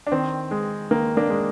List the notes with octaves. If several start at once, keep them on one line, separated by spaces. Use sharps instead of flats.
D4
D#3 C4
G#3
D#3 A#3
A#3 D4
G#3